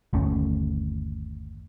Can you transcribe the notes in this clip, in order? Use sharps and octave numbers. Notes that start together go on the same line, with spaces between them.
G1 D#2 A3 C#4